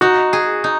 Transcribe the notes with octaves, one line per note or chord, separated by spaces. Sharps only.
D#4 F#4
G#4
D#4